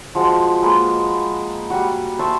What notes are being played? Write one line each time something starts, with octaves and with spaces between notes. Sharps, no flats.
F3 G#3 F#4
G#3 A#3 B4 D#6
G3 F#4
C5 E5 A5 C#6